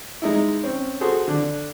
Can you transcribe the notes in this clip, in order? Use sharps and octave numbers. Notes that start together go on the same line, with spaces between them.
G#3 D#4 E4
C4 C#4
F#4 G#4 A4 C5
D3 D4